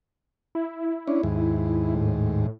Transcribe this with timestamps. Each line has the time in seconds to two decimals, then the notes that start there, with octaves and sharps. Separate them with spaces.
0.55 E4
1.07 C#4 D4
1.23 D#2 G#2
1.95 A2